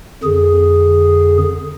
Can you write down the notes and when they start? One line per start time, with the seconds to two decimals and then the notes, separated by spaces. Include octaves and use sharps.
0.23 F2 D3 G#4